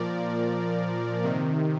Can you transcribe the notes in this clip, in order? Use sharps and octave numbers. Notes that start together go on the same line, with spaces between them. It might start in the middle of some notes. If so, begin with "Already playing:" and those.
Already playing: A#2 F3 A#4 D5
C3 D#3